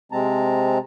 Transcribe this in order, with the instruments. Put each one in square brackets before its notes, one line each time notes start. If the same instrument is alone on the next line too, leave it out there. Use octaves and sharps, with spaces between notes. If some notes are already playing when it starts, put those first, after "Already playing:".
[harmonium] C3 G#3 C4 A5 A#5